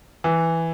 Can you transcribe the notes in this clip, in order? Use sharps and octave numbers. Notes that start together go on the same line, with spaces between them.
E3